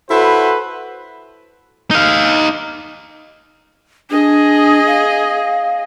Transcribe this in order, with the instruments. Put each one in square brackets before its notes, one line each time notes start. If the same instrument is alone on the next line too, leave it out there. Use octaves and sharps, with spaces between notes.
[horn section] E4 F#4 A4 B4 C5
[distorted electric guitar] D#4 F5
[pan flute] D4 [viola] G#4 D#5
[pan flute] F5